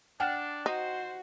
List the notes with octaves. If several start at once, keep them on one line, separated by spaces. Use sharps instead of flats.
D4 F#5 G5 F6
D#4 F#4 C5